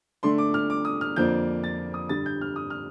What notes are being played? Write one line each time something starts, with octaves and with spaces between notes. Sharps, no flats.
D3 A3 D4 C6
D6
F6
D6
D#6
F6
F2 D3 F3 A#3 D4 G6
A6
D#6
G2 D3 G3 A6
G6
F6
D#6
F6